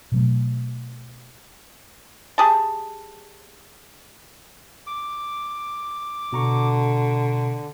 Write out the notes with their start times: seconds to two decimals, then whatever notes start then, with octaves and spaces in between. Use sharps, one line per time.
0.12 B2 F#3 A3
2.38 G4 G#4 A5
4.87 D6
6.32 B2 D3 A#5 C#6